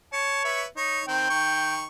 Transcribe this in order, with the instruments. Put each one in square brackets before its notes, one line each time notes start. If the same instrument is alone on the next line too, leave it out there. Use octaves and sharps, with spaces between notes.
[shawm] C#5 [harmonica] A5
[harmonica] B4 E5
[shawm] D#4 [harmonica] C#5
[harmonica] D#3 C4 [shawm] G5
[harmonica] D#3 C#6